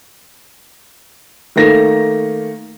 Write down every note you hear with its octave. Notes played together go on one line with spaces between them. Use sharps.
D#3 A3 A#3 A#6